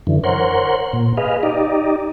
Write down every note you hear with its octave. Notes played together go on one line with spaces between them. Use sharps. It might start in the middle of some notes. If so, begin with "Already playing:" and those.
F#2 D3 E3
A#4 C5 C#5 F#5 C6
A#2
G#4 B4 D#5 F5
D#4 G4 D5 D#5